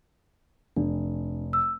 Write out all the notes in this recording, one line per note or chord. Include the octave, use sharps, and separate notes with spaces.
F1 D4
E6